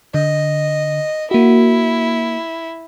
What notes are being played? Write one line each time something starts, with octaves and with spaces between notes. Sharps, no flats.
D3 D#5
A#3 E4 F#4